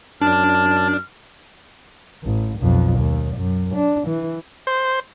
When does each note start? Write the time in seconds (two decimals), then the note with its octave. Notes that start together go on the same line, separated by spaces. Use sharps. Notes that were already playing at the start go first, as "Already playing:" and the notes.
0.22 F#2 D4 A5 F6
2.24 A1
2.59 B1 F2
2.99 D#2
3.36 F#2
3.75 D4
4.08 E3
4.67 C5